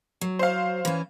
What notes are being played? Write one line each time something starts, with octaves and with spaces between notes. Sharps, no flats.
F#3
C5 F5
E3 C#4